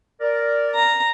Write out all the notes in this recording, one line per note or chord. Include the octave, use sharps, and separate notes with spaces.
A#4 D5
A#5